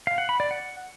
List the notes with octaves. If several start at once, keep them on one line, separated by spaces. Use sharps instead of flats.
F5
F#5
B5
D5
F#5